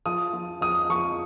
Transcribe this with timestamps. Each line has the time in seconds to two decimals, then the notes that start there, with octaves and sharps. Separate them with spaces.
0.06 F3 D#6
0.33 F3
0.61 F3 D#6
0.90 F3 C#6